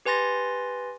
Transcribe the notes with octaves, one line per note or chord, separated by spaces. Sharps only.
G4 B4 G#5 C6 A6 A#6